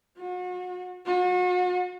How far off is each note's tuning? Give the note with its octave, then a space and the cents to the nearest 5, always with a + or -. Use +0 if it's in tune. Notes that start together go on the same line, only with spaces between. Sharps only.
F#4 -35
F#4 -40